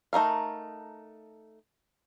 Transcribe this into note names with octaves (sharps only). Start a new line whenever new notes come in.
A3 D#4 A#4 F5